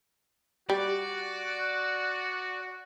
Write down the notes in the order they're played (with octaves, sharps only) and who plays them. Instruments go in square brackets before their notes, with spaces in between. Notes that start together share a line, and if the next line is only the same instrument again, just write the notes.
[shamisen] G3 [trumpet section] F#4 [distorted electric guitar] D5